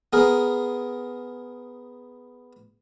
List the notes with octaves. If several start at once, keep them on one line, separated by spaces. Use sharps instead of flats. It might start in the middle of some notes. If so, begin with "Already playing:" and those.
B3 G#4 A#4